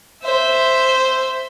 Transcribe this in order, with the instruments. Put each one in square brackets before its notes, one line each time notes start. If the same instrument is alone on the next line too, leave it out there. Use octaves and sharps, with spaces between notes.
[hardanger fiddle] C5 E5